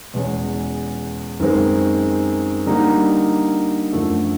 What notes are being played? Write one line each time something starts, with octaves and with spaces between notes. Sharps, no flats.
E2 B2 G#3 C#4
F#2 D#3 G#3 C4
D3 G3 A#3 D#4
F#2 D3 F3 A3